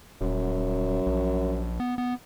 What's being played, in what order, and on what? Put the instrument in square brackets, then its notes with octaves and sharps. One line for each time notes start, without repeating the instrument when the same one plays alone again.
[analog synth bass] D#1 [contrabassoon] F#2
[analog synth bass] A#1
B3
B3